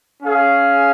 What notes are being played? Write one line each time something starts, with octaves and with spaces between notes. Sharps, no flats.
C#4 G#4 F5